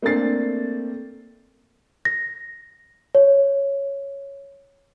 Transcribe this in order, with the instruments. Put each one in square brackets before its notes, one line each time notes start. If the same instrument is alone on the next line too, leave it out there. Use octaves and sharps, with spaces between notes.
[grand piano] A3 A#3 C4 D4 A6 C7
[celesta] A#6
C#5